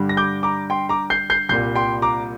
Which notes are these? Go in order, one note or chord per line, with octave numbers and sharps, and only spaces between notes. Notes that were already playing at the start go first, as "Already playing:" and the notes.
Already playing: G2 D3 G3
A#6
D6 G6
A#5 D6
G5 C6
A#5 D6
G6 C7
G6 C7
C2 A#2 G3 G6 C7
G5 C6
A#5 D6